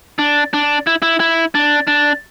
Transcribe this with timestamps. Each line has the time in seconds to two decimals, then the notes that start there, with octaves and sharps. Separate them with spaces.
0.19 D4
0.54 D4
0.87 E4
1.02 E4
1.20 E4
1.55 D4
1.87 D4